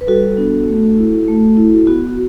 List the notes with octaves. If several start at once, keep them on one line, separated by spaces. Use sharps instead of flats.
B4
G3 F#4 A4
B3 D4
A3
E4
A3
E4
B3 F#4